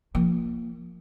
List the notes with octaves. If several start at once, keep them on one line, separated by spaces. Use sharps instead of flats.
F3 A#3